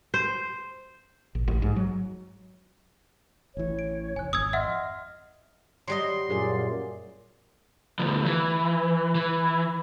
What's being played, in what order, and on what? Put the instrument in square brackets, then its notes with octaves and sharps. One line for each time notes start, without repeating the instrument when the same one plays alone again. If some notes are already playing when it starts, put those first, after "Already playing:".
[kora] C5
[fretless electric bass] A#1
A1
G#2
F#3
[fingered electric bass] A1 E3 [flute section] C#5
[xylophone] D7
[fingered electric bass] F1 [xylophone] G#5 F#6
[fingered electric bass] G#1 F2 [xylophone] D#6 E6 G#6
[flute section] D#5 C6 F6 [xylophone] E5 F#5 E6
[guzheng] F#3 G3 D#5 [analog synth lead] C6
[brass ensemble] F#2 A#2 [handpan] G#4 A#4 D5
[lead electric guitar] D2 F3
E3
E3